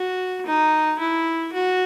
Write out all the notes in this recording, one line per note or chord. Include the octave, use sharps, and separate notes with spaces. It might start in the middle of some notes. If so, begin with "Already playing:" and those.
Already playing: F#4
D#4
E4
F#4